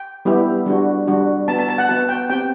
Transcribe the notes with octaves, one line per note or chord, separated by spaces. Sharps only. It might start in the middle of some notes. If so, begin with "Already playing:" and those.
Already playing: G5
G3 B3 E4 G4
G3 D4 F#4
G3 D4 F#4
B3 F#4 A5
A5
A5
F#5
B3 F#4 A5
G5
C4 G4 G5